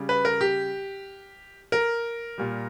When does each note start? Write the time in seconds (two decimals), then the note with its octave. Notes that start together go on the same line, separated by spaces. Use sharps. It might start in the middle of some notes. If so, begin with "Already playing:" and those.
Already playing: C#3 G3
0.09 B4
0.25 A#4
0.41 G4
1.72 A#4
2.38 A#2 G3